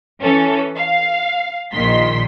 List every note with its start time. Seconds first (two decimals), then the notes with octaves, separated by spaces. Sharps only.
0.21 E3 C#4 A4
0.77 F5
1.73 A#1 A#2 D#3 C6 B6